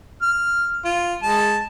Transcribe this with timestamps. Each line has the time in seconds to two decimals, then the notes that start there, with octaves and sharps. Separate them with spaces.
0.22 F6
0.85 F4
1.23 G#3 A5